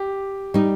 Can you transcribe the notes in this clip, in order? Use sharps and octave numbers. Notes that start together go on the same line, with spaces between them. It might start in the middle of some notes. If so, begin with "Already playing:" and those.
Already playing: G4
G3 D#4